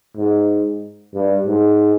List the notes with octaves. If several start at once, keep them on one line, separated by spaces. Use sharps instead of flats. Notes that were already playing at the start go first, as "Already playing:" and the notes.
G#2
G2
G#2